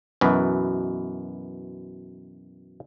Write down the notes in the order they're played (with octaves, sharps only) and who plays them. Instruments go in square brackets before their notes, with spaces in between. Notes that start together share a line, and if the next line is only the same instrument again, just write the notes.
[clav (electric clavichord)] F#2 B2 E3